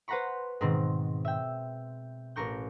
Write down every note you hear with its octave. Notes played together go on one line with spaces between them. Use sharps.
B4 C5 F#5 A#5 B5 C#6
G#2 B2 D#3 C4
E5 G5
A1 A#4 C#6 G6